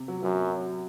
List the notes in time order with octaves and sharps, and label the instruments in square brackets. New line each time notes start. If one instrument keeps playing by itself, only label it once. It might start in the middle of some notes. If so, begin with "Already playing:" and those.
Already playing: [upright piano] C3
F#3
[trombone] F#2 [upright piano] F#3